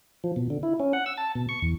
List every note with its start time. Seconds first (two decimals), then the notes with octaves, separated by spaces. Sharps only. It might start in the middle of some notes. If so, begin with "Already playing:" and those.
0.24 F3
0.36 B2
0.50 D3
0.63 E4
0.80 C#4
0.93 F#5
1.06 E6
1.17 A5
1.35 B2
1.49 C#6
1.62 E2